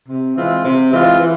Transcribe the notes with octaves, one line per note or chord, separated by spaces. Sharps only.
C3
E3 G#3 C4 F4
C3
E3 G#3 C4 F4
E3